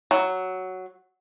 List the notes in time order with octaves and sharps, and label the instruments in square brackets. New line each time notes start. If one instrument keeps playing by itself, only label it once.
[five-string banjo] F#3